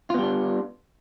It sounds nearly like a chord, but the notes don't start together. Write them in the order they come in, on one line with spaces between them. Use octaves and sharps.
F4 B3 G3 D4